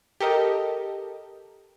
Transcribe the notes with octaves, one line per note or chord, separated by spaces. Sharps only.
G4 A4 A#4 D#5